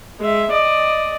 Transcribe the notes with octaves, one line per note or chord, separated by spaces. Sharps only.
G#3 E5
D5 D#5